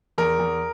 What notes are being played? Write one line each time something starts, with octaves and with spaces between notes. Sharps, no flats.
E2 A#4
E2